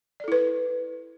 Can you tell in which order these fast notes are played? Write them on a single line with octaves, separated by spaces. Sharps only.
D5 A4 E4 B4